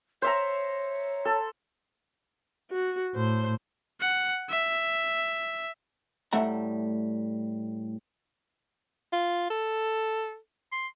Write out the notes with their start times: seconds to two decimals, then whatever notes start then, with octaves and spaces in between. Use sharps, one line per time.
0.22 C5 C#5 E5 A#5
1.25 A4
2.71 F#4
3.15 A2 C5
4.01 F#5
4.50 E5
6.33 A2 G3 A3 E5 F#5 A#5
9.13 F4
9.50 A4
10.72 C6